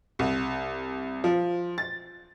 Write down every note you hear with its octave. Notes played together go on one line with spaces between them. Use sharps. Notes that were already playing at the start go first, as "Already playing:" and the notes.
C2
F3
A6